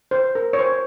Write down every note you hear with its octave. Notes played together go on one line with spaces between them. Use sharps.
C5
A#4
C#5
C5